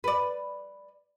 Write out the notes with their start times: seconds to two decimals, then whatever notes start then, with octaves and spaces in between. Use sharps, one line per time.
0.04 B4 D5